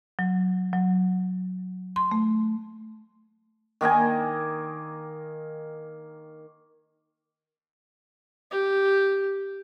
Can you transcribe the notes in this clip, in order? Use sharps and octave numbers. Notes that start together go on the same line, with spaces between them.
F#3
F#3
C6
A3
D#3 A#3 D#5 G#5
G4